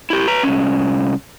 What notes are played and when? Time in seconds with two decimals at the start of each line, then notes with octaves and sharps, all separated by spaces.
0.10 E4 G4
0.27 B4 A#5
0.43 C2 C#4